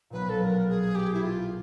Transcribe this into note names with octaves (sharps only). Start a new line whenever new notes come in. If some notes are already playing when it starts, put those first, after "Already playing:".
B1 A#2 F#3 B3 B4
A4
B4
A#4
G#4
G4
E4
F4